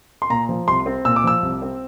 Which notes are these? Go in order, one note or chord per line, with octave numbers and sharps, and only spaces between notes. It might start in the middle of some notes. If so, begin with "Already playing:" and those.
C6
A#2 A#5
F3
C2 C6
C4
A#2 E6
D6
F3 E6
C2
C4